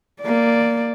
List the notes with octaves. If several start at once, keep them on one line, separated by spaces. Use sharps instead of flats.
A#3 D5